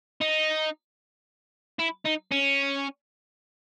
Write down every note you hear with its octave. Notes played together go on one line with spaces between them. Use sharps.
D#4
E4
D#4
C#4